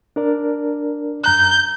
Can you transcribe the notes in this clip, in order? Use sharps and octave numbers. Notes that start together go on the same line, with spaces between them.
D4 A#4 D5
F#2 A#5 F#6 G6